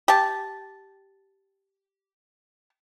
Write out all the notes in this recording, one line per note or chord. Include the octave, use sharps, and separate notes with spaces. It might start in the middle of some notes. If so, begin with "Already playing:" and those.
G4 A5